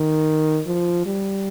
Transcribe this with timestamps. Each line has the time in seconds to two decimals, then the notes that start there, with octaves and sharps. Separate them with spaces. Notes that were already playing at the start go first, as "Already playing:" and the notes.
Already playing: D#3
0.67 F3
1.06 G3